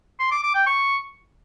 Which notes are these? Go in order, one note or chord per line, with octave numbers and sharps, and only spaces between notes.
C6
D6
D6
G5
C#6